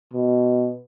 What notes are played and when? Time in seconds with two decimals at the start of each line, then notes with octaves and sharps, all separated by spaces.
0.13 B2